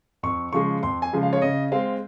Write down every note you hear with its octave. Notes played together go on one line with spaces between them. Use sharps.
F2 C#6
C#3 F3 G#3 C#6
F2 C6
G#5
C#3 F3 G#3
F5
C#5
C#3 D#5
G#3 C4 F5